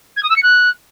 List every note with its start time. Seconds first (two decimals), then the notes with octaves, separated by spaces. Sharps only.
0.17 G#6
0.23 D#6
0.30 E6
0.36 C#7
0.43 F#6